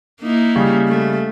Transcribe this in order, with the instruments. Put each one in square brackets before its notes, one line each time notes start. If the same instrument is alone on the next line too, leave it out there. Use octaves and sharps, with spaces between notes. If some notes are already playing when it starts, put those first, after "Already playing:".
[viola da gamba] A#3 D#4 E4
[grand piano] C#3 G3
[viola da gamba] A3